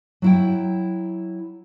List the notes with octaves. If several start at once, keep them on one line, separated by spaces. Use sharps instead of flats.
F#3 E4 G5